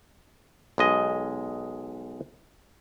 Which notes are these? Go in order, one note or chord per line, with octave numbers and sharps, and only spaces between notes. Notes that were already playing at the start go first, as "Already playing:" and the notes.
B1 G#3 D#5